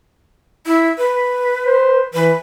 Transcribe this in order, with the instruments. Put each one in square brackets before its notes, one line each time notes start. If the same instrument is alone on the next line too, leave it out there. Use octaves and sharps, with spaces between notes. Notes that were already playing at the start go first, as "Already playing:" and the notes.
[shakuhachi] E4
B4
[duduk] C5
[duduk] E3 [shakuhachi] B4